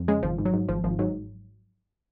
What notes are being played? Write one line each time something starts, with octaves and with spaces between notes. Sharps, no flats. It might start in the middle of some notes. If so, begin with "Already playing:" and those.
Already playing: F2
C#3 G#3
G#1 F3
G#2
F#3
G#2
G#1 F3
G#1 F3
G#2 F#3